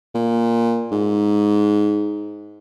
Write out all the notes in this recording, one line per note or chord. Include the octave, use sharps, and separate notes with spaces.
A#2
G#2